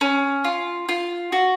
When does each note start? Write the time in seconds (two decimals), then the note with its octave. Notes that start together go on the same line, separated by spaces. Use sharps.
0.01 C#4
0.44 F4
0.89 F4
1.32 F#4